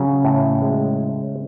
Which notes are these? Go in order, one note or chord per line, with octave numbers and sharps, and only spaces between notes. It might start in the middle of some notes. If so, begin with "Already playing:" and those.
Already playing: C#3 F#3 C#4
A2
G#3